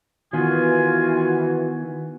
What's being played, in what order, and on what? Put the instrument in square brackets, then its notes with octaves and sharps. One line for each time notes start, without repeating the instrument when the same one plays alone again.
[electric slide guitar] D#3 B3 [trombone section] E3 F#4 [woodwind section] F4 G#5